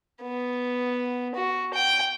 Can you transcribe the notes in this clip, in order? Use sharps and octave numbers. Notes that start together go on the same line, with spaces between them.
B3
F#4
G5